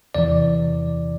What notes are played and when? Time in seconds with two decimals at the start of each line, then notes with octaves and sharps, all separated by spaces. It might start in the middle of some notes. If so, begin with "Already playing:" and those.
0.15 E2 C3 E3 D5